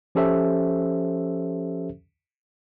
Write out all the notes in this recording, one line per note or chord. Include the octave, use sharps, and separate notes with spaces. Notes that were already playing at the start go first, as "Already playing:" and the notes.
F3 C#4 G4 A4 C5 E5